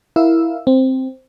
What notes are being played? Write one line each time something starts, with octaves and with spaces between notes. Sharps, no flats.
E4 A#4 F5 E6
C4